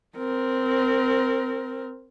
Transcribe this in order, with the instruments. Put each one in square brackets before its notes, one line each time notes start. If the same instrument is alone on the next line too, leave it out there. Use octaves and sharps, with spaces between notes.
[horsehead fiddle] C4 A#4